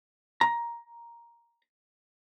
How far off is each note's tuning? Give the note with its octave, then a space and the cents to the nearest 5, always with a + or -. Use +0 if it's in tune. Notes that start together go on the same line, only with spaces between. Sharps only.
A#5 +10